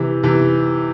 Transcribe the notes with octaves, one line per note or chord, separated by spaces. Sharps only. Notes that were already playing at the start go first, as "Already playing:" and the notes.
Already playing: C3 E3
C3 E3